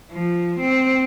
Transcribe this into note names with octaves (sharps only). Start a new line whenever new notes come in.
F3
C4